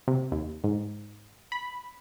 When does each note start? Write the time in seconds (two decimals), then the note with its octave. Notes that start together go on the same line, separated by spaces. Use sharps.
0.08 C3
0.32 D#2
0.64 G#2
1.52 B5